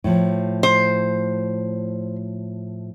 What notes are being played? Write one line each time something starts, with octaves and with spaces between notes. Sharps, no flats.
A2 F3
C5